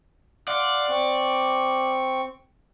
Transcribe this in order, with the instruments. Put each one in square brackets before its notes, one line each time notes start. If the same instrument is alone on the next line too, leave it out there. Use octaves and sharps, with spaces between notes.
[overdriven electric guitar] D5 [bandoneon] F5 F#5 C6
[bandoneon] C4 C#6